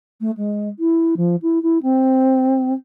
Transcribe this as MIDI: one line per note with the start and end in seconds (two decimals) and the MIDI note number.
0.20 0.30 57
0.37 0.68 56
0.78 1.14 64
1.16 1.35 53
1.42 1.61 64
1.62 1.78 64
1.82 2.73 60